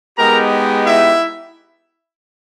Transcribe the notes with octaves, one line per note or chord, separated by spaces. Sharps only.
G#3 B3 D#4 G4 A#4 A#5
E4 E5